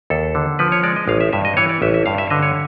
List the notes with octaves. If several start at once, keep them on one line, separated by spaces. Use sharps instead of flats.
D#2 A4
D3
F3 B4
C#5
G#3 D5
D#5
A1 F5
E5
G2 E5
D#5
E3 C#5
D5
A1 E5
E5
G2 F5
E5
D3 D#5
C#5